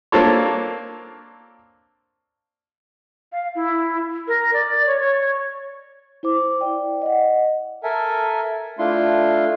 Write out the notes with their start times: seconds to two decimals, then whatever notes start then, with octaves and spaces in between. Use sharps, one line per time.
0.12 A#3 C4 D4 F4 A4 C#5
3.32 F5
3.55 E4
4.28 A#4
4.53 D5
4.86 C#5
4.99 C#5
6.23 E4 C5 D6
6.61 D5 G5
7.02 D#5 F#5
7.83 A4 A#4 E5 G#5
8.79 A3 D4 E4 F4 C6